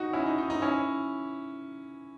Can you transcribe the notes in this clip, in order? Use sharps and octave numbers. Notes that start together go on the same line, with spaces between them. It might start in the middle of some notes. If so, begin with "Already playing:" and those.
Already playing: D#4 F#4
C#4 E4
D#4
D#4
D#4
C#4 E4